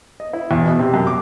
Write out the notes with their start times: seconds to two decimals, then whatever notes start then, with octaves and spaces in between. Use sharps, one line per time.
0.20 D#5
0.33 E4
0.51 E2
0.65 B2
0.79 C3
0.94 F#2
1.07 D6